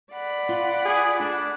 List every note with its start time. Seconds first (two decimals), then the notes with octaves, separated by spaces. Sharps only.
0.12 D5 F#5 B5
0.49 F4
0.86 G#4
1.20 A3 D4